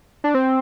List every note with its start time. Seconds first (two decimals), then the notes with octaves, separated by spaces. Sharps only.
0.24 D4
0.34 C4